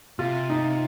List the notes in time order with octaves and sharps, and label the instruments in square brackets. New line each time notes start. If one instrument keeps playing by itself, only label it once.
[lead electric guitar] C3 [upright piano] F4
[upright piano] D#4